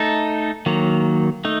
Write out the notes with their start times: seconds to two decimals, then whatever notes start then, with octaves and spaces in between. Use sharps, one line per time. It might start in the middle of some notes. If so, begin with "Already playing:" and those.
Already playing: A3 D#4 A4
0.66 D#3 F#3 A#3
1.45 A3 D#4